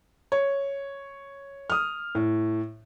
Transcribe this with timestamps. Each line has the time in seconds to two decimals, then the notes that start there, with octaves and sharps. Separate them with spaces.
0.32 C#5
1.70 D#6 F6
2.15 A2